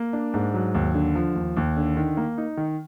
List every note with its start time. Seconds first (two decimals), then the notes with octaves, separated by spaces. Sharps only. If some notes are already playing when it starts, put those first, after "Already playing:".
Already playing: A#3
0.13 D4
0.34 G#2
0.54 F#3
0.75 D#2
0.94 D3
1.15 F3
1.36 D#2
1.57 D#2
1.77 D3
1.97 D#3
2.17 A#3
2.38 D#4
2.57 D#3